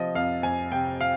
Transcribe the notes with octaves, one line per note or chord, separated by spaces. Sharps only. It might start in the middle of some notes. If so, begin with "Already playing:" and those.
Already playing: C3 F3 D#5
F2 F5
F2 G#5
C3 G5
F5